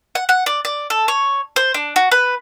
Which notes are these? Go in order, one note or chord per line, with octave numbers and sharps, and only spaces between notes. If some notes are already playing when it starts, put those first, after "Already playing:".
F#5
F#5
D5
D5
A4
C#5
C5
D4
F#4
B4